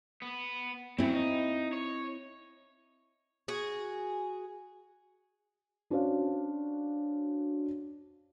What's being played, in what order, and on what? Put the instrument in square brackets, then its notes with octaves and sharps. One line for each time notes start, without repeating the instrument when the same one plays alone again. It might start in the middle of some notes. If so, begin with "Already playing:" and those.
[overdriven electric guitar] B3
[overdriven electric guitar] C#3 F#3 [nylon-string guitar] C4 E4
[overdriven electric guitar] D#4
C#5
[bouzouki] F#4 G#4
[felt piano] C#4 D4 F#4 C5 C#5 F5